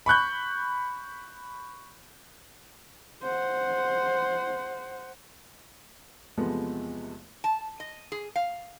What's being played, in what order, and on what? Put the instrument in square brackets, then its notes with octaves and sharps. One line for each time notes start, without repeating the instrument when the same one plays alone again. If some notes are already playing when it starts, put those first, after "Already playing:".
[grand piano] B5 C#6 F#6 G6
[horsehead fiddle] C5 F#5
[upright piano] E2 C3 F3 G#3 A3 B3
[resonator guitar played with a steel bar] A5
D#5
G#4
F5